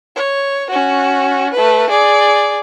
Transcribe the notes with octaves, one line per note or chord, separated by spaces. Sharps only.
C#5
C#4 F#4
A3 B4
G#4 D5